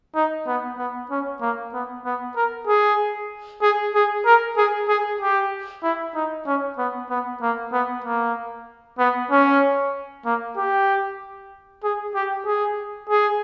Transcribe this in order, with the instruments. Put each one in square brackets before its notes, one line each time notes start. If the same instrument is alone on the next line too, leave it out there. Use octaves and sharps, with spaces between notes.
[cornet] D#4
B3
B3
C#4
A#3
B3
B3
A#4
G#4
G#4
G#4
A#4
G#4
G#4
G4
E4
D#4
C#4
B3
B3
A#3
B3
A#3
B3
C#4
A#3
G4
G#4
G4
G#4
G#4